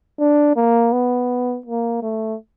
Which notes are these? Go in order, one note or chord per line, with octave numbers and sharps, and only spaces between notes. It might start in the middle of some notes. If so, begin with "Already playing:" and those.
D4
A#3
B3
A#3
A3